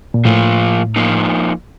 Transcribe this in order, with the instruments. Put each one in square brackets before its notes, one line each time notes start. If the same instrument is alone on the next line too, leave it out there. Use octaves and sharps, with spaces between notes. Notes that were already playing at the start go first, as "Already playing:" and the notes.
[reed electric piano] A#2
[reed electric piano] A2 [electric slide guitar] F3 A#3 F4
[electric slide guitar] A#2 F3 A#3 D#4